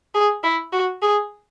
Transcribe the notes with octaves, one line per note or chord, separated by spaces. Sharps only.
G#4
E4
F#4
G#4